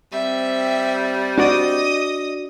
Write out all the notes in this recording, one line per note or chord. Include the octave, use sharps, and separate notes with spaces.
G3 C4 E5
D4 F#4 D5 D#5 D#6